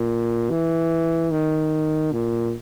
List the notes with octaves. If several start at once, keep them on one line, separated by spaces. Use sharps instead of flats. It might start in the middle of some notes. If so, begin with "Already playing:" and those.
Already playing: A#2
E3
D#3
A#2